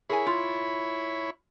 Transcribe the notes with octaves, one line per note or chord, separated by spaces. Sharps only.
E4 G#4 A#4 C#5 G#5 B5
F4